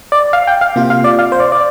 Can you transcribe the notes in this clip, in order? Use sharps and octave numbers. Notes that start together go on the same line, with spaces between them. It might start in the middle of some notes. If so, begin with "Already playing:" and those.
D5
F5
G5
F5
C3 A#3 F4
F5
D5
F5
C5
D5
D5